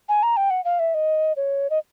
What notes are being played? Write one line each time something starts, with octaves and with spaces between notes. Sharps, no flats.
G#5
A#5
G5
F#5
F5
E5
D#5
C#5
D#5